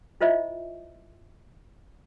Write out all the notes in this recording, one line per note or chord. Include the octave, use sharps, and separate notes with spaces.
E4 F4 C5 D#5 E5